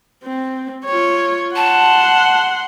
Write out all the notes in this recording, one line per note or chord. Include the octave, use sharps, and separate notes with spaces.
C4
F4 C#5
F#5 A5 C6